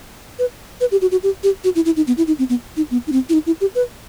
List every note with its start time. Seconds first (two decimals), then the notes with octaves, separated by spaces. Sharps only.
0.39 B4
0.81 B4
0.92 G4
1.02 F#4
1.12 F#4
1.23 G4
1.44 G4
1.64 F#4
1.75 E4
1.86 E4
1.96 D#4
2.07 B3
2.17 E4
2.27 D#4
2.39 C4
2.49 B3
2.77 D#4
2.91 B3
3.07 D#4
3.12 C4
3.29 E4
3.33 D#4
3.46 E4
3.61 G4
3.75 B4